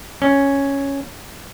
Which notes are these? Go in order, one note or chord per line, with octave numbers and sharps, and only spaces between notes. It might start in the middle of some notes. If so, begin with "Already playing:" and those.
C#4